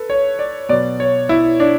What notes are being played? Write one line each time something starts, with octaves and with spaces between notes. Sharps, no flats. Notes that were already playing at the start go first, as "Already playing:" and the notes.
Already playing: A4 B4
C#5
D5
B2 F#3 B3 D5
C#5
E4
D4